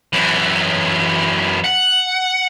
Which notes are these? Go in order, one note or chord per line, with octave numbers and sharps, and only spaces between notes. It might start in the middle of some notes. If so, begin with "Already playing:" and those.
F#2 E3
F#5